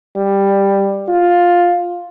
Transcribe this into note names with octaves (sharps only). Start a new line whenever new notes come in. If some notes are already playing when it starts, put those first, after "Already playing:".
G3
F4